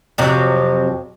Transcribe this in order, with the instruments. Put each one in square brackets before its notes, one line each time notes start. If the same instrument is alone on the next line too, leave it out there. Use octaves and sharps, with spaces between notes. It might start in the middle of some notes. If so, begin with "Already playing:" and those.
[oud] F2 C3 F#3